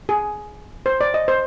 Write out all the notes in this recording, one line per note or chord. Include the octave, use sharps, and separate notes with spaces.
G#4
C5
D5
D#5
C5